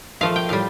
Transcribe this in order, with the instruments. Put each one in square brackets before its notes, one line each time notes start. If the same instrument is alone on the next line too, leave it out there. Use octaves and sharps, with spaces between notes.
[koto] A#2 F3 A3 F5
G5
A2 G3 F5